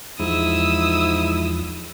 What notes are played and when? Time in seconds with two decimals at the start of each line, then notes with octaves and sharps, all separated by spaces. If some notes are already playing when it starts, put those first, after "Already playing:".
0.20 E2 G#2 F3 E4 D#6 E6